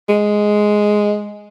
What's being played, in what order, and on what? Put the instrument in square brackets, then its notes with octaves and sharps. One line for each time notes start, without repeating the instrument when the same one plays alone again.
[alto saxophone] G#3